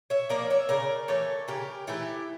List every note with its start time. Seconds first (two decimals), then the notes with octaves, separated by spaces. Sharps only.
0.10 C#5 E5
0.29 F3 A#3 A#4 D5
0.50 C#5 E5
0.69 C#3 A#4 D5
1.08 E3 A3 A4 C#5
1.48 C#3 G4 A#4
1.87 E3 A3 E4 G4